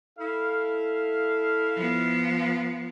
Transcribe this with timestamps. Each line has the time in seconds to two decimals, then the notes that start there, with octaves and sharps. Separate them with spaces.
0.19 E4 A4 F5
1.77 F3 B3